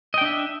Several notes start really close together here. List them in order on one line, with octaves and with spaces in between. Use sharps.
D#5 G5 D4 E5